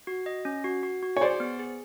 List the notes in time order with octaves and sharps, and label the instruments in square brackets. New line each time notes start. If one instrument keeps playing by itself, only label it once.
[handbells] F#4
D#5
C#4
F#4
F#4
F#4
[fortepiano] C#5
[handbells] G#4 [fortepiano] C5 D5
[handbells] B3
G#4